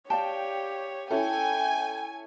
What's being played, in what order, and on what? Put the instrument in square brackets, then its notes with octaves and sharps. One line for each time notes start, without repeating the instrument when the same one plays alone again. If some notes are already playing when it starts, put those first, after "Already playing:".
[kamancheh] G4 C#5 [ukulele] D5 F5 A5 [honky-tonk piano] G5
[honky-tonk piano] C#4 E4 A4 [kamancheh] G5 [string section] G#5